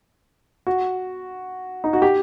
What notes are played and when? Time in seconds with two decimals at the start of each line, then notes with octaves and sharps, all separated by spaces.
0.67 F#4
1.84 D#4
1.93 F#4
2.02 G4